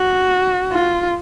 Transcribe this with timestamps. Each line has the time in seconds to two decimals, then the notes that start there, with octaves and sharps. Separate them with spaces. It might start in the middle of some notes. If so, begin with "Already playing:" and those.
Already playing: F#4
0.72 F4